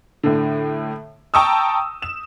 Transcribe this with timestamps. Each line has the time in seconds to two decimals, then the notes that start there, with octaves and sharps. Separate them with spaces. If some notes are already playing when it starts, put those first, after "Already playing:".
0.23 A2 D3
1.34 G5 A5 A#5 C#6 D#6 E6
2.02 E7